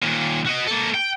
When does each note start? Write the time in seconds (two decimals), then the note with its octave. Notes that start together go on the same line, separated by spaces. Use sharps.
0.02 D#2 A#2
0.46 F#4 D#5
0.67 A#3 A4
0.94 G5